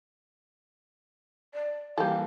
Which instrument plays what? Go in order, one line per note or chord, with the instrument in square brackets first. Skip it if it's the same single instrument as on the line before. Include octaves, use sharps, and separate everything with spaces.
[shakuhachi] D5
[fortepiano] E3 G3 A#3 [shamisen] G4 A4 [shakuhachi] F5